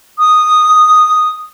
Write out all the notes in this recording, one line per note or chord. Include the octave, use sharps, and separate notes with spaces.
D#6